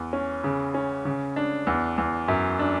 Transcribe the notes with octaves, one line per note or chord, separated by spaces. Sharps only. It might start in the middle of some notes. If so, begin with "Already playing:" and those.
Already playing: E2
C#4
C#3
C#4
C#3
D4
E2
E2
F#2
D4